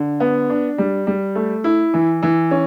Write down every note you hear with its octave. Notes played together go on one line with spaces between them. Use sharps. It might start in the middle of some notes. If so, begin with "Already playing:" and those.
Already playing: D3
B3
D4
G3
G3
A3
E4
E3
E3
C#4